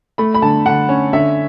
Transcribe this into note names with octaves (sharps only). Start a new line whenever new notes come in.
A3 B5
B5
D3 A5
D3 F#5
C#4
D3 E5